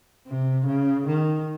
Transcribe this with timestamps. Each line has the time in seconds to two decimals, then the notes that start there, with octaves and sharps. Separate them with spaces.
0.27 C3
0.67 C#3
1.07 D#3